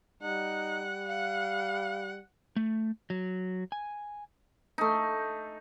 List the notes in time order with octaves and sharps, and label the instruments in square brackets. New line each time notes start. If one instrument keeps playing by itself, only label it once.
[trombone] G3 [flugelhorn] D#4 [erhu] F#5
[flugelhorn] F5 [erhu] F#5
[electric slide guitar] A3
F#3
G#5
[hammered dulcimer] A3 D#4